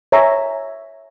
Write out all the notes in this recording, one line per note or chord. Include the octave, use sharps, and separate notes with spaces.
C#5 E5 G#5 A#5